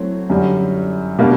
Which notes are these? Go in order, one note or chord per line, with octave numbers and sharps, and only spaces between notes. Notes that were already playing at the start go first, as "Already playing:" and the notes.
Already playing: F#3 A3 C4 E4
F#2 D3 G3
B2 G3 A#3 D4